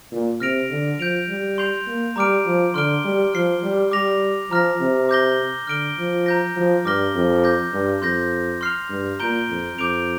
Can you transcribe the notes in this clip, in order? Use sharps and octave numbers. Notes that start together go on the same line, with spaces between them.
A#2
C3 F6 A#6 D7 F7
D3
F3 G6 D7 F7
G3
C6 G6 C7 F7
A#3
G3 A#5 D6 F6 D7
F3
D3 C6 F6 D7 G7
G3
F3 F6 C7 G7
G3
G3 D6 A#6 F7
F3 A#5 F6 A#6
C3
D6 G6 A#6 G7
D3 F6 D7 G7
F3
A#5 G6 A#6
F3
G2 D6 F6 A#6 G7
F2
D6 G6 A#6
G2
F2 C6 G6 A#6
C6 F6 C7 F7
G2
A#2 A#5 G6 D7 G7
F2
F2 D6 G6 D7 F7